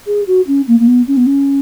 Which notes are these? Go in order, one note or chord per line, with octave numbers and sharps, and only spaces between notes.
G#4
F#4
C#4
A#3
A#3
B3
C#4
B3
C#4